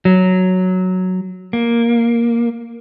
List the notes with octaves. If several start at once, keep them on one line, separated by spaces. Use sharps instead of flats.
F#3
A#3